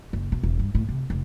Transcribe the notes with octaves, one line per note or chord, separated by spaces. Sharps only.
F#1
B2
E1
G2
A2
C3
F1